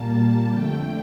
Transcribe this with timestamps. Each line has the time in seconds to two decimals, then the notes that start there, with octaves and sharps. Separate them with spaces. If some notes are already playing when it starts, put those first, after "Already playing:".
Already playing: A#2 G3 A#3 A5
0.49 F2 D3 A3 G5